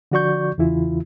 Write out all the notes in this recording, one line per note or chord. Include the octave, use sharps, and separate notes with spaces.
D3 F3 F#4 D5 C#6 G6
E2 C#3 E3 E4 F4